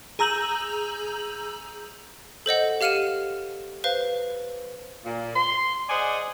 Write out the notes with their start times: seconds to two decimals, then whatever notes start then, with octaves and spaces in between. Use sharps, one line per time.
0.19 G#4 A#5 E6 G6 F#7
2.46 A4 C5 D#5 F#5
2.81 G4 F5 F6 C#7 D#7 E7
3.84 B4 C5 F5
5.04 A#2
5.34 C6
5.89 G#4 C5 D5 D#5 F#5 G#5